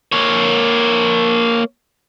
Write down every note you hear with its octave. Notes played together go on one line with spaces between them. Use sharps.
A#3 C#5